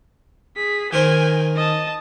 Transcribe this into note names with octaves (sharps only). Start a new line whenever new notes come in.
G#4 B6
D#3 A#4 C5 G#5 G6
D#5 A5